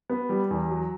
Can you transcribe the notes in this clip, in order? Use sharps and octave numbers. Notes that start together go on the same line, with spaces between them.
B3
G3
E2
F#3